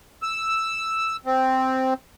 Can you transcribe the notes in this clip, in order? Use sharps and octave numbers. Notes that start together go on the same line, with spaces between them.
E6
C4